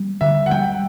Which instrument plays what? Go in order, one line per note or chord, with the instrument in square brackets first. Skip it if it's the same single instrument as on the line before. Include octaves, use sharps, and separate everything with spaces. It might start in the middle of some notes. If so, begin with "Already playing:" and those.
Already playing: [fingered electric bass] G3
[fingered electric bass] D3 [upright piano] E5
[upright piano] F#5
[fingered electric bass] G3 [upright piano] G5